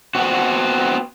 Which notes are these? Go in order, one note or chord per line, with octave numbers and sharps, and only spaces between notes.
B3 C4 F#4